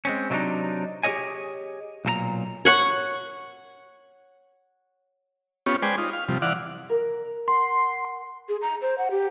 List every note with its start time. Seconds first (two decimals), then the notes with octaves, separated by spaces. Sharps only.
0.05 G#3 C4 C#4
0.30 C3 F#3 A3 C4 D4 D#4
1.03 G4 G#4 A#4 C#5 D#5 G#5
2.05 B1 A#2 A4 A#5
2.65 C#5 F#5 C#6
5.66 B3 C#4 F4 G4 C#5
5.82 G#3 B4 C5 D5 G5 G#5
5.98 D#4 F4
6.13 F5
6.29 C3 F3 G3
6.42 E3 D5 F5 F#5
6.89 A#4
7.48 F#5 C6
8.49 G#4
8.62 A#5
8.82 C5
8.98 F#5
9.11 G4